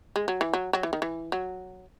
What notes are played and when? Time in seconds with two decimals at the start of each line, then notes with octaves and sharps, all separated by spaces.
0.16 G#3
0.28 F#3
0.41 E3
0.53 F#3
0.73 F#3
0.83 E3
0.93 D#3
1.02 E3
1.32 F#3